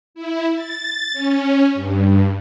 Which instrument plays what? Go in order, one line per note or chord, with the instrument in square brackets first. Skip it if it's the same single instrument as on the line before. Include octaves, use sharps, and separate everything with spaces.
[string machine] E4
A6
C#4
G2